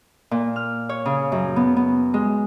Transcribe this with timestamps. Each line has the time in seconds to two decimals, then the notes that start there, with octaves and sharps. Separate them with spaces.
0.31 A#2
0.56 F6
0.89 C#5
1.06 C#3
1.32 F#2
1.56 B3
1.77 B3
2.14 G#3